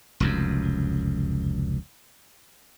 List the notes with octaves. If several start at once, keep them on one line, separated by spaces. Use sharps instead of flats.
F1 C#2 F#2